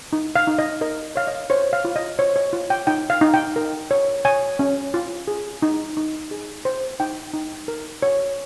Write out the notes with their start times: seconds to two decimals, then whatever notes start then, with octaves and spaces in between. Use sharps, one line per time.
0.13 D#4
0.36 F5
0.47 D#4
0.59 D#5
0.81 A#4 D#5
1.16 C#5 F5
1.27 D#5
1.50 C5 C#5
1.73 F5
1.85 F4
1.96 D#5
2.19 C5 C#5
2.36 C#5
2.53 F4
2.70 G5
2.87 D#4 G5
3.10 F5
3.21 D#4
3.34 G5
3.56 A#4
3.91 C#5
4.25 C#5 G#5
4.59 C#4
4.94 F4
5.28 G#4
5.62 D#4
5.97 D#4
6.31 G#4
6.65 C5
7.00 D#4 G5
7.34 D#4
7.68 A#4
8.02 C#5